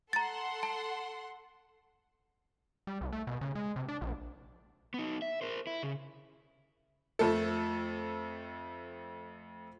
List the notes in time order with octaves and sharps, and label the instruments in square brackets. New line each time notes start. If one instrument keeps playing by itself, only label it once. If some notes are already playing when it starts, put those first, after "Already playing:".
[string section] A4 F#5 C6 [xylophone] A#5 A6
[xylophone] A5
[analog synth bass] G3
C2
A3
B2
C#3
G#3
C3
D4
A#1
[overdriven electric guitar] B3 D#4
E5
A#4 C5
E4
C#3
[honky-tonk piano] F2 A3 A4